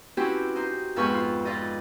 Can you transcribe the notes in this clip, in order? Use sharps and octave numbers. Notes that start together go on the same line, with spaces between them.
C4 C#4 E4 F#4 G4 B4
D#4 C5
F2 G#2 B3 B4 C#6 F6
F4
F4 B4 D5 D#5